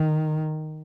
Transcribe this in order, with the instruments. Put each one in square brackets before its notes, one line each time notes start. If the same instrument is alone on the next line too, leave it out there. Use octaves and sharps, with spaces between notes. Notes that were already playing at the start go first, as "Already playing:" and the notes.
Already playing: [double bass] D#3